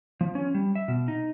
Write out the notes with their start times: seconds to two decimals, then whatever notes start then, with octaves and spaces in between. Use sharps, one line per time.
0.21 F3
0.35 C#4
0.55 G3
0.75 E5
0.88 B2
1.08 D#4